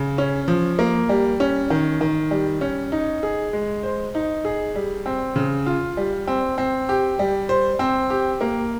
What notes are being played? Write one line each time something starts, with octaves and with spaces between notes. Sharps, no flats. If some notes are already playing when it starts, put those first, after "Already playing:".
Already playing: C#3
C#4
F3
A#3
G3
C#4
D#3
D#3
G3
C#4
D#4
G#4
G#3
C5
D#4
G#4
G3
C4
C#3
F4
G3
C4
C4
G4
G3
C5
C4
G4
A#3